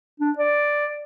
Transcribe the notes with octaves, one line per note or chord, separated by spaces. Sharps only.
D4
D5